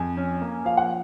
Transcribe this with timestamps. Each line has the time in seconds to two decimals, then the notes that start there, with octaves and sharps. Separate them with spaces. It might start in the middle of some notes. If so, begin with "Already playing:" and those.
Already playing: F2 G#5
0.17 C#4
0.41 A#3
0.64 F3 F5
0.77 F#5